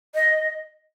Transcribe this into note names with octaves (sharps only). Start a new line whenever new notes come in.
D#5